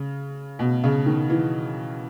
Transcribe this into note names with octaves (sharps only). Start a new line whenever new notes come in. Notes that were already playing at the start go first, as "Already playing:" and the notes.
Already playing: C#3
B2
C#3
D#3
E3